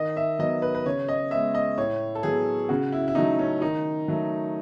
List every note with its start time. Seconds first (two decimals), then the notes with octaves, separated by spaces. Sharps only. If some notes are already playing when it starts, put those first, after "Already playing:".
Already playing: D#3 D#5
0.17 E5
0.39 F#3 B3 D#5
0.62 B4
0.75 B4
0.86 C#3 C#5
1.08 D#5
1.31 G#3 B3 E5
1.55 D#5
1.78 A2 C#5
2.15 A4
2.23 F#3 B3 G#4
2.69 C#3 F#4
2.92 E4
3.08 E4
3.15 F#3 A3 D#4
3.39 C#4
3.61 D#3 D#4
4.08 F#3 A3